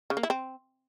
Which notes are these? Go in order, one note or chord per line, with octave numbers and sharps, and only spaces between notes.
C#3
A#3
E4
C4